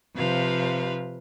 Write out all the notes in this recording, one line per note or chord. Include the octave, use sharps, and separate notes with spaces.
C3 F3 B4 F5